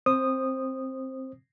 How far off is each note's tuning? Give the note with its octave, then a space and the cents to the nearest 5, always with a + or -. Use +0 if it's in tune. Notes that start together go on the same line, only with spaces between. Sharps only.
C4 +10 C5 +15 D#6 -10